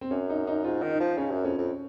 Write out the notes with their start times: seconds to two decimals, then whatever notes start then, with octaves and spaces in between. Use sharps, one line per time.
0.01 C4
0.11 F#2 C#4
0.30 D#4
0.47 D#4
0.64 G#2 F4
0.82 D#3
0.91 D#4
1.00 F3
1.17 C#3 C#4
1.31 F#2
1.44 F2 C#4
1.58 F2